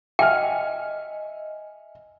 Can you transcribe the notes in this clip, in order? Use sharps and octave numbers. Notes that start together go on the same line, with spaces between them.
D#5 E5 G5 G#5 F6